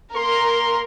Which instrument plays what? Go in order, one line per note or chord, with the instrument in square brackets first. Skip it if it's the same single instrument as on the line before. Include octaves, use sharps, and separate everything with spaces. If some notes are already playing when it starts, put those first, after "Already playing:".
[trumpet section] A#3 C6 [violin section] A#4